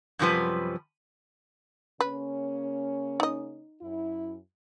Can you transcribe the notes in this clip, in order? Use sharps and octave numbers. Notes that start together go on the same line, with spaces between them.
F#2 A2 C3 F3 G3 B4
C#3 A#3 C#4 B4
D#4 D#5
F#2 E4